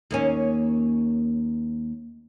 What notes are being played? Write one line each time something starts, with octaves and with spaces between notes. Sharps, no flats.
D#2 A#3 C#4